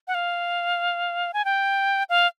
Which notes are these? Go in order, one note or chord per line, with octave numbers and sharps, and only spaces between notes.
F#5
F5
G#5
G5
F5